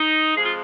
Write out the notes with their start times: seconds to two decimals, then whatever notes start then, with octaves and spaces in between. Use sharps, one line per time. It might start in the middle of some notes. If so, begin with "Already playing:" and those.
Already playing: D#4
0.34 F2 F3 G#3 G#4
0.46 F4